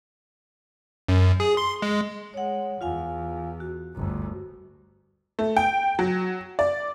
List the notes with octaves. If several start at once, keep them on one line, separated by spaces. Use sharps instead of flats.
F#2
G#4
C6
G#3
G#3 C#5 F#5
E2 F4 F5 G#5
F#4
G1 D2
A3
G5
F#3
D5